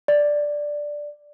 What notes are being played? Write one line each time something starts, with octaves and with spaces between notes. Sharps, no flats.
D5